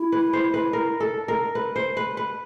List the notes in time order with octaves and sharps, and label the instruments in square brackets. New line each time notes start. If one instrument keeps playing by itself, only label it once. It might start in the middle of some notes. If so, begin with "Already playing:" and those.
Already playing: [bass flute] E4
[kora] B4
C5
B4
A#4
A4
A#4
B4
C5
B4
B4